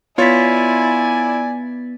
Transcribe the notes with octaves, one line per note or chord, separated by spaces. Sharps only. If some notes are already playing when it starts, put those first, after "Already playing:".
B3 E4 F4 C#5 D5 G#5 A6 B6